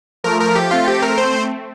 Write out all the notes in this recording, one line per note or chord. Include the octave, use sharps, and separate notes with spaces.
F3 A3 A#4
A#4
G4
A3 C4 F4
G4
A#4
C5